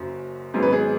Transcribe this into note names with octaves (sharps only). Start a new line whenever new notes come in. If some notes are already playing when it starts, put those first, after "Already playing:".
Already playing: F#1 F#2 F#4
G#1 G#2 F#3 B3 G#4
B4
G#4